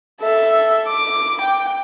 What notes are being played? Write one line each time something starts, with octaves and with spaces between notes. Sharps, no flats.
A4 E5
D6
G5